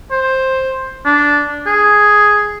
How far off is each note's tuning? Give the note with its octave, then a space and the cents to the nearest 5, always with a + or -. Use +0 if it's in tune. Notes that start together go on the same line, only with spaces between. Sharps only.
C5 +10
D4 -10
G#4 +5